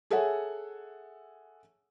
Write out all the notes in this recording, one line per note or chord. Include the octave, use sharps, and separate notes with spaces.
G#4 A4 C#5 E5 F#5 G#5